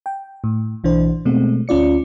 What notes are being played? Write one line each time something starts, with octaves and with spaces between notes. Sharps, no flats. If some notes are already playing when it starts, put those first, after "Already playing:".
G5
A2
B1 E3 D4 C5
B2 G#3 A3 C4
D2 C#4 F4 D5 C#7